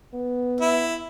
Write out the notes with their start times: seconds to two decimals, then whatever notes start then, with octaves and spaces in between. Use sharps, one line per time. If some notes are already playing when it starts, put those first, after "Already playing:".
0.14 B3
0.60 E4